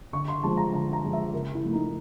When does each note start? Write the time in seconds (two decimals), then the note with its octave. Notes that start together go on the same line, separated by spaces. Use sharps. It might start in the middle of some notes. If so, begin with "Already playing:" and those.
0.13 D3 C#6
0.28 C6
0.43 F3 G#3 A5
0.57 A#5
0.73 D3 A#5
0.93 A#5
1.04 F3 G#3
1.13 E5
1.33 C#3 A#4
1.54 E4
1.63 F3 A3
1.73 D#4